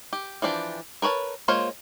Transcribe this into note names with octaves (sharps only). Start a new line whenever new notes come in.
G4
E3 F3 D4 G4
A#4 B4 C#5 A5
G#3 A#3 F4 C5 C#5